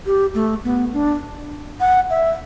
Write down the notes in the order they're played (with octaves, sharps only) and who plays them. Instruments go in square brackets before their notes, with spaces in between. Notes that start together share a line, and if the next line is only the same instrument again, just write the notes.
[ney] G4
A3
B3
D4
F#5
E5